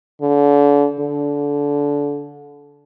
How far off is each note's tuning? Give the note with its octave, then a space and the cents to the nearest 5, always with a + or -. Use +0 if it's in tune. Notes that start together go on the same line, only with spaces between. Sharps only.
D3 -35
D3 -25